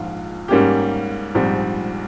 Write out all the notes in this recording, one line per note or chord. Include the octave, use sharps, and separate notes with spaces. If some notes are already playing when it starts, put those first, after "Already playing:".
Already playing: A#1 G#2 F3 F4
G#2 G3 A#3 C#4 G4
A#1 G#2 G3 C4